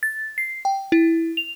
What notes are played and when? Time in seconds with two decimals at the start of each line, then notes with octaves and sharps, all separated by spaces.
0.03 A6
0.38 C7
0.65 G5
0.92 E4
1.37 F7